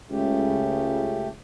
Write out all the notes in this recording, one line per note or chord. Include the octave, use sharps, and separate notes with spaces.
C#2 C#3 A3 G4